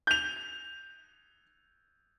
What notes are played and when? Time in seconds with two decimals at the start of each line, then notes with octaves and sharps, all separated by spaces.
0.07 G6 F7